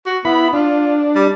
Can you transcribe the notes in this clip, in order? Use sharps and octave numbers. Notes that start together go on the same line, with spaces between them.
F#4
B3 E4 B5
D4 F4
G3